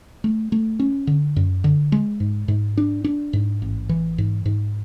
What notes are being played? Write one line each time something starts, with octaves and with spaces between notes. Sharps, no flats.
A3
A3
C#4
D3
F#2
D3
G#3
G#2
G#2
D4
D4
G#2
A1
E3
G#2
G#2